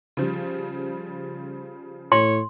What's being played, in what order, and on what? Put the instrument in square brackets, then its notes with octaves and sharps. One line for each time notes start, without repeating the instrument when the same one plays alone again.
[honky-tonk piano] C#3 F3 G3
[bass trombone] A2 [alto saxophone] C#5 [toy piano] C6